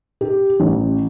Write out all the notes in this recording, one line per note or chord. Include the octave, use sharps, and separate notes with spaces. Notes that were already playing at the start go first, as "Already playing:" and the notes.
G4
A1